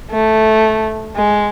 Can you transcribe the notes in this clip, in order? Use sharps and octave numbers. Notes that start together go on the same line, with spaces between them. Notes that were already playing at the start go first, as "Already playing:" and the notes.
A3
G#3